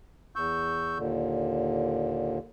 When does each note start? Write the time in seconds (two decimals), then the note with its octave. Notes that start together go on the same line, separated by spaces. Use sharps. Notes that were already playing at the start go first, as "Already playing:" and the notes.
0.36 E2 C#6 E6 G6
0.98 D#2 A#2 D3